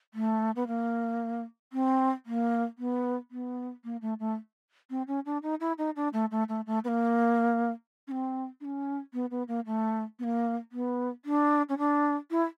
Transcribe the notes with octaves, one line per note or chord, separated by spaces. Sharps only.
A3
B3
A#3
C4
A#3
B3
B3
A#3
A3
A3
C4
C#4
D4
D#4
E4
D#4
D4
A3
A3
A3
A3
B3
A#3
C#4
C4
D4
C#4
B3
B3
A#3
A3
B3
A#3
B3
D4
C#4
D4
E4